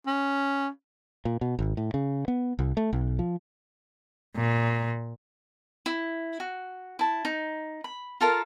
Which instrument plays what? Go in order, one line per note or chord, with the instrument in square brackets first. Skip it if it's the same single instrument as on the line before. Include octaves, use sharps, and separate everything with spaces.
[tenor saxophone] C#4
[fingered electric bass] A#2
B2
G#1
A2
C#3
B3
C2
A3
B1
F3
[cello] A#2
[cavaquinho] E4
F#4
E4 A5
D#4
B5
F4 A4 A#4 F5